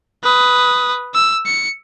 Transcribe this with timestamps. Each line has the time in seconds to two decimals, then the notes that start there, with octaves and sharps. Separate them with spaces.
0.24 B4 D#6
1.14 E6
1.46 C#7